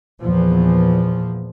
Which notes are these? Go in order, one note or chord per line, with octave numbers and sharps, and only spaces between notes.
E2 A#2 F3